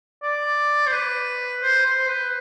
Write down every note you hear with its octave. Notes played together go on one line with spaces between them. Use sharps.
D5
C5
B4
C5
C5
B4